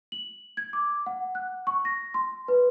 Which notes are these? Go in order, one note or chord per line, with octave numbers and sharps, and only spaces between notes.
F#7
G#6
D6
F#5
F#6
C#6
A#6
C6
B4